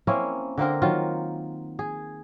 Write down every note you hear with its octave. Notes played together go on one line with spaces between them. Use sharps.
A#3 C4 C#4 E4
D3 A#3 C4 A#4
D#3 F#3 F4
G#4